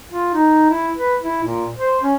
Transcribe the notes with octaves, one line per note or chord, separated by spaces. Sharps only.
F4
D#4
E4
B4
E4
A#2
C5
C#4